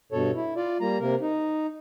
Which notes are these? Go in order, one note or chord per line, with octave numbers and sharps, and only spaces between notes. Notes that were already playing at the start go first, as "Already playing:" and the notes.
G2 B2 A4 C#5
E4
F4 D5
G3 A#3 A#5
C3 A#3 A#4
D#4